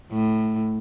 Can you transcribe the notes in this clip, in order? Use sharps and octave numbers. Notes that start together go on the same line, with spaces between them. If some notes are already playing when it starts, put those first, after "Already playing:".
A2